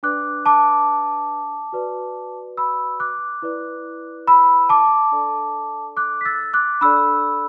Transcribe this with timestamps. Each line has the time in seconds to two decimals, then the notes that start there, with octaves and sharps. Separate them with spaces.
0.03 D4 B4 D5 D6 F#6
0.46 A5 D6
1.73 F#4 B4 D5
2.57 B5 E6
3.00 D6 F#6
3.42 E4 B4 D5
4.28 B5 E6
4.69 A5 D6
5.12 D4 A4 D5
5.97 D6 F#6
6.21 B6
6.25 E6 A6
6.53 D6 F#6
6.81 D4 A4 D5 B5 E6